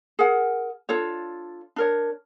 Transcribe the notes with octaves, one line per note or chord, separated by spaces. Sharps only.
G#4 A#4 F#5
D4 F4 A4 C#5
D4 A#4 C#5